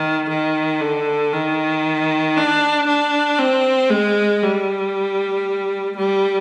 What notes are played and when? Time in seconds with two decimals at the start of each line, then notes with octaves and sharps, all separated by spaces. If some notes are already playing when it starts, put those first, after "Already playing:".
Already playing: D#3
0.29 D#3
0.81 D3
1.32 D#3
2.36 D4
2.87 D4
3.39 C4
3.90 G#3
4.43 G3
5.97 G3